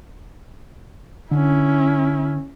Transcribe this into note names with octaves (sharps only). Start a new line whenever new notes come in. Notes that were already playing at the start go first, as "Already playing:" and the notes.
D3 C#4 E4